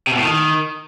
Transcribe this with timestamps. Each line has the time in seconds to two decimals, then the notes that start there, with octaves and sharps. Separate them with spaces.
0.07 C3
0.13 B2
0.19 A2
0.24 D#3